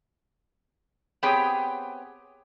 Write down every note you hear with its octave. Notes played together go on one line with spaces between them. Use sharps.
B3 C4 G4 G#4 C#5 G5